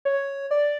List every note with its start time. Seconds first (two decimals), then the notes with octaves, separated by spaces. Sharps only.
0.05 C#5
0.51 D5